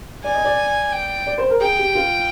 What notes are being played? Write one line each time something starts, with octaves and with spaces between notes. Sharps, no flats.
D5 G#5
D#5
D5
G5
D5
C5
A#4
G#4 G5
G4
F4